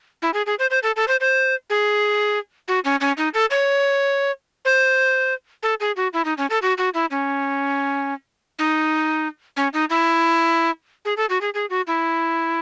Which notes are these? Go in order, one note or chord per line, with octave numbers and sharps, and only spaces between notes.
E4
G#4
G#4
C5
C5
A4
A4
C5
C5
G#4
F#4
C#4
C#4
D#4
A4
C#5
C5
A4
G#4
F#4
E4
D#4
C#4
A4
F#4
F#4
E4
C#4
D#4
C#4
D#4
E4
G#4
A4
F#4
G#4
G#4
F#4
E4